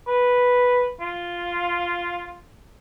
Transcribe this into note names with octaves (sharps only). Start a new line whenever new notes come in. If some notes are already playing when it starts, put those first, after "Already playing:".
B4
F4